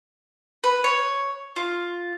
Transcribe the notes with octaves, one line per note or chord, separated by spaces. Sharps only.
B4
C#5
F4